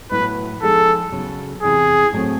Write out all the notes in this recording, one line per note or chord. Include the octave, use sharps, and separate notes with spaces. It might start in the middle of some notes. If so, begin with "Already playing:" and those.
A2 F#3 B3 E4 B4
F3 G#3 B3 D#4 G#4 A4
C#3 F#3 B3
E2 C3 E3 G#4
A2 F#3 A3 C4